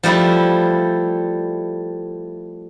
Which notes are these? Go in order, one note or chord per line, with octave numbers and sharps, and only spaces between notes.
F3 G3 A3 E4 G4